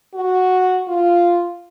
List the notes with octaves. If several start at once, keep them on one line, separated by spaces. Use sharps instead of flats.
F#4
F4